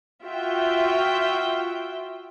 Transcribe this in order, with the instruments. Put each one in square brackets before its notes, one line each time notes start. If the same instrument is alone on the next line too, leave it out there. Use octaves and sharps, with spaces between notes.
[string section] F4 F#4 E5 G5